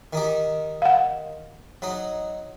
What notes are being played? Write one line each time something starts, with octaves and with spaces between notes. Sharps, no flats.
D#3 D#4 G4
F5 F#5
F#3 D#4